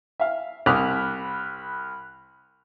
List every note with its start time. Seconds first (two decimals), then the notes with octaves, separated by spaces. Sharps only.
0.20 E5 F5
0.66 C2 B5 D6 D#6 F6 F#6